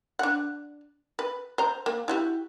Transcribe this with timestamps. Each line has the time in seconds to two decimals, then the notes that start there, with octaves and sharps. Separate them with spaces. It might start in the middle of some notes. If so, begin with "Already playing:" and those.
0.19 D4 F#5
1.19 B4
1.58 C5 A#5
1.86 A#3
2.08 E4 F#4 G4